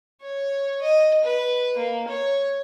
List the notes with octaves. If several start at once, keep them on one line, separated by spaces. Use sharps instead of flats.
C#5
D#5
B4
A#3
C#5